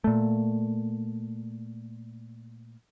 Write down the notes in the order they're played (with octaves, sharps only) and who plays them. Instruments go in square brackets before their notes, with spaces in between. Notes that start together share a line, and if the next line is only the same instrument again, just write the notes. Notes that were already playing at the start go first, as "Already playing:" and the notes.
[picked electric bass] A#2 A3